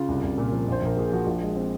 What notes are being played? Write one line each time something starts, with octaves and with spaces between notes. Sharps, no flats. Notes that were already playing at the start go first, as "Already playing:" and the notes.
Already playing: C#3 F4
C2
C2
A#2
F3
A#1 C5
A#1 A#4
A#2 G#4
F3 F#4
A#1 F4
G#3
C4